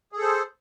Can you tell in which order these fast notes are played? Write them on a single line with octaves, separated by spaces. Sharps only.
G#4 A4 C5